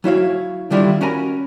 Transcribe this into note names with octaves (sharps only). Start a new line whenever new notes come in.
F#3 E4 C#5 F5
D3 D#3 G3 D4 E4 F4
C#4 F#4 A#4 G#5 A#5 B5